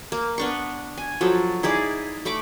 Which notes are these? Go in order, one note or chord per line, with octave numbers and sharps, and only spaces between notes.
A#3
B3 D4 C#6
G#5
F3 F#3 A4
D#4 E4 G#4 D5
A3 B5 C#6 D6